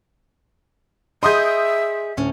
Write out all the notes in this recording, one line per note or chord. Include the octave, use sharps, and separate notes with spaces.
G#4 D#5 E5 C6 D#6 G6
D2 A2 C#4